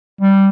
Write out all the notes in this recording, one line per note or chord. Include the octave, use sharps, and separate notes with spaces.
G3